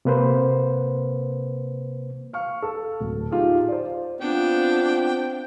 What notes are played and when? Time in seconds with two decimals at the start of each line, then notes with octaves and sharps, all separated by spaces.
0.05 C3 A#3 B4 C5
2.33 F5 C#6 F6
2.62 A4
3.00 D1
3.31 D#4 F4 G4 G#4
3.68 C5 D5
4.21 B3 C4 D4 F4 G5